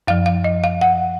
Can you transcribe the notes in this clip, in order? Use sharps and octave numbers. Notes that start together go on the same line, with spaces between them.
F#2 F3 F5
F5
D#5
F5
F#5